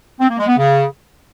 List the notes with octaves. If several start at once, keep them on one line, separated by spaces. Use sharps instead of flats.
C4
A#3
G#3
B3
C#3